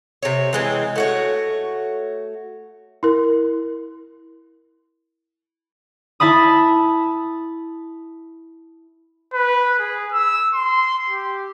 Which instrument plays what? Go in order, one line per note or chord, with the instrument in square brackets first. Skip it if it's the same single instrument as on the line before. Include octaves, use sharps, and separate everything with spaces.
[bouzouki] C3 C#5
E3 G#3 C4
A3 F#4 C#5
[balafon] E4 A#4
[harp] E4 E5 A5 B5 D#6
[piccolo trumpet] B4
G#4
E6
C6
G4